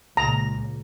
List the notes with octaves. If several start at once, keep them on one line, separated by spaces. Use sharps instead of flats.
C#2 A#2 A#5